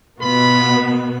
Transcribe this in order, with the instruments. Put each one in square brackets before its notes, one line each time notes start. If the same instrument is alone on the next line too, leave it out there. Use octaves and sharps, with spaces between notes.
[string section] B2 B3 [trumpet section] F4 B5